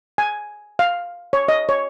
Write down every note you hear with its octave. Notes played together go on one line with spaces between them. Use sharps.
G#5
F5
C#5
D#5
C#5